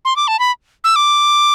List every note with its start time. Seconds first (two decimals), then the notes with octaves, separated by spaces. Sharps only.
0.05 C6
0.16 D6
0.28 A5
0.39 B5
0.84 E6
0.96 D6